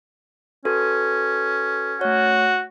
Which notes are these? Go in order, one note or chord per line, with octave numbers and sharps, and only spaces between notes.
C#4 F#4 A4 B4
A3 F#4 C#5